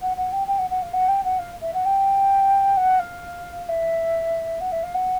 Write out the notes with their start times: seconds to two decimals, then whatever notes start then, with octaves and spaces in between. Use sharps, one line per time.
0.02 F#5
0.17 F#5
0.32 G5
0.47 G5
0.58 F#5
0.70 F#5
0.82 F5
0.93 F#5
1.08 G5
1.24 F#5
1.39 F5
1.62 E5
1.74 F#5
1.85 G5
2.77 F#5
2.99 F5
3.69 E5
4.61 F#5
4.72 E5
4.83 F5
4.94 F#5